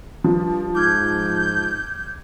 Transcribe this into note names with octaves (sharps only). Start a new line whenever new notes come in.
G2 F3
G#2 D6 F6 G6 G#6